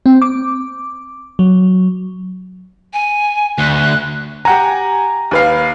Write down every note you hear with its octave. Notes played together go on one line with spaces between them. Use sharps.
C4
D6
F#3
G#5
D2 F#6
G4 F#5 G#5 A#5
D#2 B4 F5